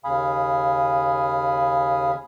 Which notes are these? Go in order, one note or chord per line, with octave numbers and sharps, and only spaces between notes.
D#2 C#3 F5 G#5 B5 D#6